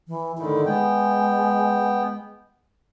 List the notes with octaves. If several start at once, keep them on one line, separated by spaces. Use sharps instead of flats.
E3
A2 D3 D#3 E4
G#3 B3 G5